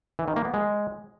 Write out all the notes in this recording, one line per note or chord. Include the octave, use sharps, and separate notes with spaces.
E3
D#3
A#3
B3
G#3